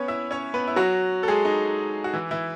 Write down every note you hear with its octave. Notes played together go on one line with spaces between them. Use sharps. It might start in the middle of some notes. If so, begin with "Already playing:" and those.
Already playing: B3 C#4 B4 C#5
E4 E5
C#4 C#5
B3 B4
E4
F#3 F#4
A4
G#3 G#4
D#4
F#4
E3 E4
E3 E4